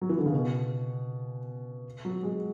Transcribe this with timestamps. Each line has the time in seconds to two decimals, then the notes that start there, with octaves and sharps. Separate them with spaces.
0.02 F#3
0.09 E3
0.18 D3
0.26 C#3
0.33 B2
2.05 F#3
2.23 G#3